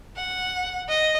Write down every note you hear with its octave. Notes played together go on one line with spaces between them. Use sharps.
F#5
D#5